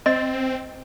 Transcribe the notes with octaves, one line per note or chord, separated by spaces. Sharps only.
C4 D#5